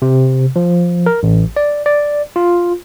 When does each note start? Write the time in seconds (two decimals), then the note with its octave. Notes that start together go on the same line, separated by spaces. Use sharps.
0.02 C3
0.56 F3
1.06 A#4
1.23 A1
1.56 D5
1.86 D5
2.36 F4